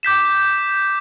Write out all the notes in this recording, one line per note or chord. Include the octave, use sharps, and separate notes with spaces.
D6 G6 B6 E7